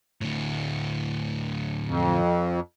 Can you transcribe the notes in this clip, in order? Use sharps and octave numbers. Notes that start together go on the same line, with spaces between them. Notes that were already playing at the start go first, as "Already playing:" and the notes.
D2 A2
F2